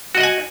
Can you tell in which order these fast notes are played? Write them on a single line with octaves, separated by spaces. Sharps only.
F#4 D#5 F#5 G#5